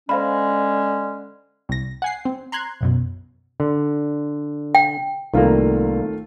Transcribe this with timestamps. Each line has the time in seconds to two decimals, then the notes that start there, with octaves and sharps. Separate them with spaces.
0.09 D3 G#3 C#4 C5 F5 B5
1.69 C2 A#6
2.02 F#5 G#5 C7
2.25 C4
2.52 A#5 C6 F#6 G#6 C7
2.81 B1 F#2 B2
3.60 D3
4.75 G5
5.34 C2 D#3 A3 A#3 F4